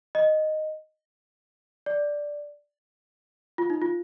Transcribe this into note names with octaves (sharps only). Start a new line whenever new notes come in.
D#5
D5
F4
D#4
F4